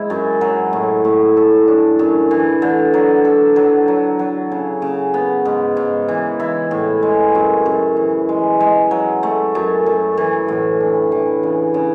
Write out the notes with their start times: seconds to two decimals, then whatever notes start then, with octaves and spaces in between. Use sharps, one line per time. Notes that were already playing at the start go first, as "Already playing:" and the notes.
Already playing: G#2 E4
0.10 F#2
0.41 F#3
0.73 A2
1.05 A2
1.37 A4
1.68 D4
1.99 F#2
2.31 E3
2.62 D3
2.94 F#3
3.25 A4
3.56 F#3
3.88 F#3
4.19 F#3
4.52 C#3
4.82 C#3
5.14 B3
5.45 G#2
5.77 G#2
6.08 E3
6.40 E4
6.71 A2
7.03 G#3
7.35 F#2
7.66 F#2
7.97 E3
8.29 G#3
8.60 G#3
8.91 F#3
9.23 A3
9.55 F#2
9.86 F#2
10.18 E3
10.48 A2
10.80 D4
11.12 E3
11.43 C#3
11.74 C#3